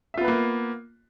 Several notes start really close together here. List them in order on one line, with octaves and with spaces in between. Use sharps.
E5 F4 B3 B4 A#3